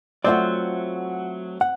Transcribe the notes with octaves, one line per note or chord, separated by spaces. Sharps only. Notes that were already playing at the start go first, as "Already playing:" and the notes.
F#3 A3 C4 F4 C5 D5 E5 F#5
F#5